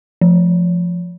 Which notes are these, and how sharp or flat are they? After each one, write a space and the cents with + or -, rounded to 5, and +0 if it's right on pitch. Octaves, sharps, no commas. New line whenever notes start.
F3 +0